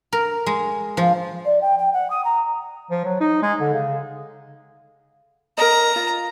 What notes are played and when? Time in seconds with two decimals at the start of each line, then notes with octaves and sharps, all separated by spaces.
0.13 A#4
0.47 G#3
0.97 F3
1.45 D5
1.61 G5
1.78 G5
1.93 F#5
2.10 D#6
2.24 A#5
2.91 F3
3.05 F#3
3.20 D#4
3.42 G#3
3.60 D3
3.73 C#3
5.58 A#4 D#5 A#5
5.96 F4